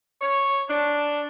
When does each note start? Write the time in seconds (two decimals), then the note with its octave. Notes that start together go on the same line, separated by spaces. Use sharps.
0.21 C#5
0.69 D4